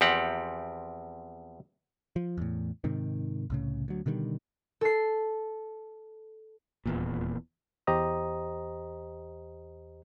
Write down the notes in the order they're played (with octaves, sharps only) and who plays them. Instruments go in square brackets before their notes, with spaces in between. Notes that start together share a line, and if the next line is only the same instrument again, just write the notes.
[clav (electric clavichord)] E2 F3 C4 G4 F#5
[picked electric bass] F3
E2 A2
G#2 C3 D#3
C2 A2 C#3
D2 F#3
B2 D3 D#3 G3
[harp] A4 C7
[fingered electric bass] D#1 E2 A#2
[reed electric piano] E2 G4 C5 D#5 A#5 D#6